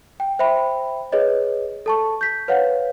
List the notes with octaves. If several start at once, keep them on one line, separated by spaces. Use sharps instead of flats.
G5
C5 E5 G5 B5
G#4 B4 C#5 D#5
A4 A5 C#6
G6 B6
B4 C#5 F5 F#5